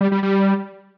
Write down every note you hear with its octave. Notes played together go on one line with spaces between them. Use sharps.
G3
G3
G3